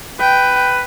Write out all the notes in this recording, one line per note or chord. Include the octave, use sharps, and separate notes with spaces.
B4 G5